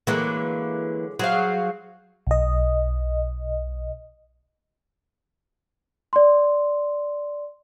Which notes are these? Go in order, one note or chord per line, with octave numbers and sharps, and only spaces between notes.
D3 E3 F#3 G#3 A#3
F#3 G#4 C5 F5
B1 D#5
D5 C6